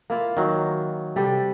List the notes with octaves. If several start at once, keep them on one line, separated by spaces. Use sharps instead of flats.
A#3 E4 F4
D#3 F#3
C3 G3 A4